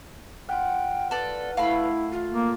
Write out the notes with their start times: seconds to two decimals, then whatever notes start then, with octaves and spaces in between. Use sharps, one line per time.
0.49 F4 F#5 G5
1.11 A4 B4 D5
1.57 A3 E4 F5 B5 E6
2.12 F4
2.32 A#3